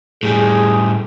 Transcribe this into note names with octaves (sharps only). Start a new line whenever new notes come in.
A2 G3 G#4